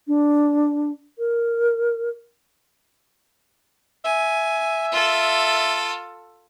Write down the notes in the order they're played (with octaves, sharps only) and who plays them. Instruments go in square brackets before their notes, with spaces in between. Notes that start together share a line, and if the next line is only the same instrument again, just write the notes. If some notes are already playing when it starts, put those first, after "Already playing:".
[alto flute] D4
A#4
[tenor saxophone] E5 [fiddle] G#5
[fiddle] F4 A4